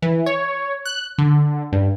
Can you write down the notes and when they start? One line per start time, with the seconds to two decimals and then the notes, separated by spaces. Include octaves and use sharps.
0.02 E3
0.26 C#5
0.85 F#6
1.18 D3
1.72 G2